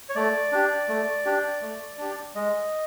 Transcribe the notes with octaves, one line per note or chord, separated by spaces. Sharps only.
C#5
A3 D5
D4 G4
A3
D4 G4
A3
D4 G4
G#3 D#5